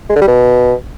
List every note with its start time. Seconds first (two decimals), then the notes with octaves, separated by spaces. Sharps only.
0.10 G#3
0.16 D3
0.22 G3
0.28 B2